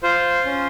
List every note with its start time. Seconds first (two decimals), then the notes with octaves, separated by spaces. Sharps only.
0.03 F4 C5
0.46 C#4